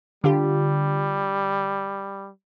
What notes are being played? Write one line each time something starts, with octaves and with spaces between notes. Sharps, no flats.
D3 G3 F4 G4